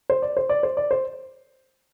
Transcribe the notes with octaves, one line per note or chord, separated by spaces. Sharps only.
C5
D5
C5
D5
C5
D5
C5